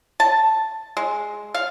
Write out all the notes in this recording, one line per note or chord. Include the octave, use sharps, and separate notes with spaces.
A5
G#3
F5